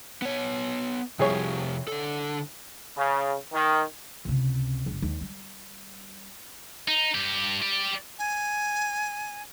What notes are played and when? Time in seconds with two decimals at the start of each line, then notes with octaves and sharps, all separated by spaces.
0.22 B3 C#5
1.19 C2 C3 F3 G4 G#4 C#5
1.88 D3 A4
2.97 C#3
3.52 D#3
4.25 C#2 C3
4.86 F#1
5.02 D#2
5.21 G3
6.88 D#4
7.14 G2 G4
7.62 G4 D5
8.19 G#5